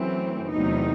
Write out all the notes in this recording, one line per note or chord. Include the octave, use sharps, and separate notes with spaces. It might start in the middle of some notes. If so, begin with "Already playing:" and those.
Already playing: F#2 E3 A3 C4
E2 C3 F#3 A3 D#4